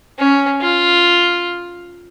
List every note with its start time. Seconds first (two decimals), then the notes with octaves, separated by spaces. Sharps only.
0.19 C#4
0.60 F4